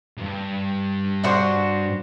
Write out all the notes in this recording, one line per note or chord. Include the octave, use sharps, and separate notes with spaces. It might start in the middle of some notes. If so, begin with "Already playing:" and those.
D2 G2
D4 F#4 C5